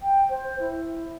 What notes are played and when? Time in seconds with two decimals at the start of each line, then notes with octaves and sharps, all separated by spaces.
0.02 G5
0.29 C5
0.60 E4